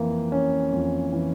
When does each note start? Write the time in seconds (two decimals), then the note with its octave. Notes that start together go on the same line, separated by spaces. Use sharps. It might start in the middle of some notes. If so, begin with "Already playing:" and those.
Already playing: F2 E3 A#3
0.32 C#4
0.72 F2
1.13 E3